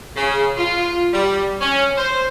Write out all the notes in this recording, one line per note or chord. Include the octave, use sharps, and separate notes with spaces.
C#3
F4
G3
C#4
C5